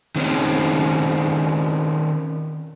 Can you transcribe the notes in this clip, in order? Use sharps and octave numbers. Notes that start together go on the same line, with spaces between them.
D#3 C4 C#4